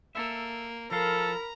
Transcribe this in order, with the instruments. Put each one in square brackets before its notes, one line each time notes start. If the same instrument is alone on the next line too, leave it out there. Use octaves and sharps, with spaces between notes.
[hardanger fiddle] A#3 [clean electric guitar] A4 E5
[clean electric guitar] F3 F5 [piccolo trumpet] A4 [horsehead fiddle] A#4 B5 [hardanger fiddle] A#5